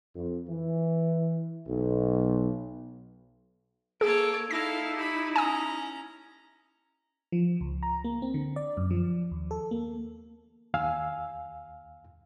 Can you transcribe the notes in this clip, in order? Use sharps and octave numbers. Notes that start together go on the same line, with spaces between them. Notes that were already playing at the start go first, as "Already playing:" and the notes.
F2
E3
B1
A#3 G#4 A4 C#5 D7
D#4 E4 A4 F5 A#6
G4 B5
C#4 G#5 A#5 D#6
F3
C#2
A#5
A#3
C4
D3
D5
F#2
F3
D#2
A4
A#3
D#2 F5 G#5 E6